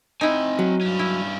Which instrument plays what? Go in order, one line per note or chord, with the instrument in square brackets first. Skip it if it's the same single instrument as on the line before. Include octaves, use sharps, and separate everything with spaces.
[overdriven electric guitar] C4 G#5 [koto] D#4 E4
[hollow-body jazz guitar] F#3
[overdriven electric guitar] G2 C#4
[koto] E4